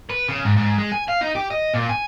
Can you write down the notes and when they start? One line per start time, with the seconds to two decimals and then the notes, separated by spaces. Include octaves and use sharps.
0.10 B4
0.28 C#3
0.44 G#2
0.56 G#2
0.78 G#3
0.92 G#5
1.08 F5
1.21 D#4
1.35 G4
1.51 D#5
1.74 A#2
1.89 G#5